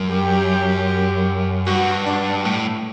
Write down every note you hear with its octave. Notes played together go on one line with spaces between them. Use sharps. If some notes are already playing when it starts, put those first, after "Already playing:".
Already playing: F#2
G4
G2 F#4
D4
A2